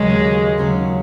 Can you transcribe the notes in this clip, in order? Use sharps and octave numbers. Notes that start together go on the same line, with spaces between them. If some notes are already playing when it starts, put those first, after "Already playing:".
Already playing: D#2 C#3 F#3 G#3 C#4
D#2 C#3 F#3 C#4